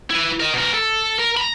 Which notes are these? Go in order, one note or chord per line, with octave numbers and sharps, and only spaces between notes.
E4 B4
A#4 D#5
B2 A#4
A4
A#4
A#5 B5